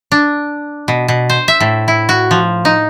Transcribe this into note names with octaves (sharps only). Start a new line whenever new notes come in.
D4
B2
B2
C5
E5
A2
E4
F#4
F3
D#4